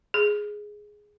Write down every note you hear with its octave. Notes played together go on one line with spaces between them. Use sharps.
G#4